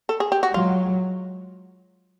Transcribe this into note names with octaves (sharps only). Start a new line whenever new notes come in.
A4
G#4
G4
F#4
F#3 G#3 F4